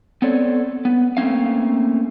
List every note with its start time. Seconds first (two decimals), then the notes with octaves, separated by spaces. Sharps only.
0.22 B3 C4 A4 C#5 D5
0.85 B3
1.17 A3 A#3 C4 C#4 F5